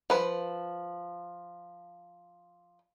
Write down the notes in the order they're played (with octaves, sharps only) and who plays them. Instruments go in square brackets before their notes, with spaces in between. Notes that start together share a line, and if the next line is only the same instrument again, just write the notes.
[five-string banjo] F3 B4